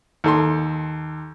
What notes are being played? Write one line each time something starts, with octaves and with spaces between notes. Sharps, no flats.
D#2 A4 C6